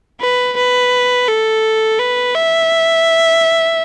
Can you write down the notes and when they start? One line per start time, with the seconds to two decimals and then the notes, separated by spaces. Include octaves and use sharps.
0.21 B4
0.57 B4
1.29 A4
2.00 B4
2.35 E5